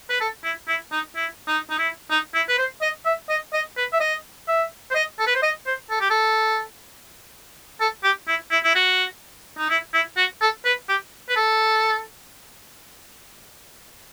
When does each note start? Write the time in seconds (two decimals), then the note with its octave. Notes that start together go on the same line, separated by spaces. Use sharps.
0.09 B4
0.20 A4
0.44 E4
0.68 E4
0.92 D#4
1.16 E4
1.47 D#4
1.70 D#4
1.79 E4
2.11 D#4
2.34 E4
2.48 B4
2.58 C5
2.82 D#5
3.05 E5
3.29 D#5
3.53 D#5
3.77 B4
3.93 E5
4.00 D#5
4.48 E5
4.91 C5
4.95 D#5
5.19 A4
5.27 B4
5.35 C5
5.43 D#5
5.66 C5
5.90 A4
6.00 G4
6.10 A4
7.80 A4
8.04 G4
8.28 E4
8.51 E4
8.64 E4
8.75 F#4
9.58 D#4
9.70 E4
9.94 E4
10.17 F#4
10.41 A4
10.65 B4
10.89 G4
11.29 B4
11.36 A4